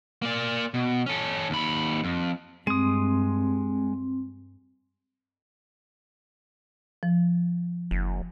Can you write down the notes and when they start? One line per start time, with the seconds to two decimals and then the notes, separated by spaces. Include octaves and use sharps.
0.22 A#3 D5
0.74 B2
1.06 C#4 A4
1.50 D#2 B5
2.04 F2
2.67 G2 G#3 C4 D#6
7.03 F3
7.91 F#1